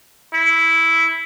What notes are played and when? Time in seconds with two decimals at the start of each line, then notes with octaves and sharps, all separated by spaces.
0.34 E4